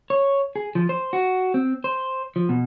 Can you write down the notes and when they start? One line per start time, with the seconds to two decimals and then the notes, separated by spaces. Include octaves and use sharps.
0.10 C#5
0.56 G#4
0.75 F3
0.89 C5
1.13 F#4
1.54 C4
1.84 C5
2.36 F3
2.49 B2